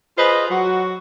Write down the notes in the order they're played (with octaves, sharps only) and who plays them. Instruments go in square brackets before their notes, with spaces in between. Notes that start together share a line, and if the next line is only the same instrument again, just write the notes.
[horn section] F4 G#4 B4 C5 D#5
F#3 F#4